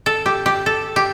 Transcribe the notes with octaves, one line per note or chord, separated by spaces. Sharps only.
A4
G4
G4
A4
G4